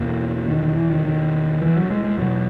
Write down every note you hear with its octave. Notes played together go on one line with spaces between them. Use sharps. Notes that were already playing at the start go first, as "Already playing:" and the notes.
Already playing: E2 B2 A#3
D#3
D#3
E3
D#3
D#3
E3
F#3
G#3
G#3
E2 B2 F#3